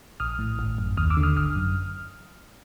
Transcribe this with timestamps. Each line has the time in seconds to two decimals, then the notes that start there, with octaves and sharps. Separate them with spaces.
0.20 A#1 D#6 F6
0.39 A2
0.59 G#1
0.78 F#2
0.97 D#2 D#6 F6
1.10 D6 E6
1.17 D3
1.23 D#6 F6
1.36 G#1 D#6 F6
1.56 F#2